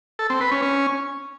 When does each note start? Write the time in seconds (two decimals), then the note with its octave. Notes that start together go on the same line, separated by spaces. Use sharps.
0.19 A4
0.30 C4
0.41 B4
0.51 C#4
0.62 C#4